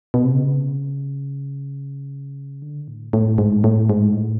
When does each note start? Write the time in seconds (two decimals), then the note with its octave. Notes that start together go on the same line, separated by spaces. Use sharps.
0.14 B2
0.24 C3
0.34 C#3
2.62 D3
2.88 A2
3.13 A2
3.38 G#2
3.64 A2
3.90 G#2
4.14 A2